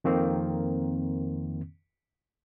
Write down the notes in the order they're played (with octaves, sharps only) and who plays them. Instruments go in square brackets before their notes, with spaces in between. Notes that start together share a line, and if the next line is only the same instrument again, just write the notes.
[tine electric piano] F2 D#3 A#3 C4